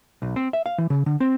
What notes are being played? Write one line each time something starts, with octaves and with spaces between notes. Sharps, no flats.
B1
C4
E5
F5
E3
C#3
D3
C4